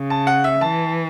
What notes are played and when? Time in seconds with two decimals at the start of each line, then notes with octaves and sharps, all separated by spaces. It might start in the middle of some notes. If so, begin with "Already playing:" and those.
Already playing: C#3
0.10 A5
0.27 F#5
0.44 E5
0.61 E3 A5